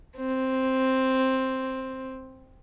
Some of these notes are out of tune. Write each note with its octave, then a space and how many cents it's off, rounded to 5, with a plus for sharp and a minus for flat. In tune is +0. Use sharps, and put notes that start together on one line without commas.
C4 +5